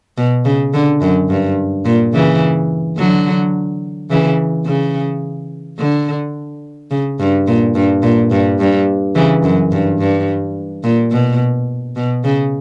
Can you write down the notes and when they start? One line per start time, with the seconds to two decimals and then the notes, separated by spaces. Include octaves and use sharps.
0.18 B2
0.45 C#3
0.74 D3
1.02 F#2
1.30 G2
1.85 A#2
2.14 C#3 E3
2.98 D3 F#3
4.11 C#3 E3
4.66 C#3
5.79 D3
6.91 C#3
7.20 G2
7.47 A#2
7.75 G2
8.03 A#2
8.31 G2
8.60 G2
9.15 C#3 E3
9.44 F#2
9.72 G2
10.00 G2
10.84 A#2
11.12 B2
11.96 B2
12.24 C#3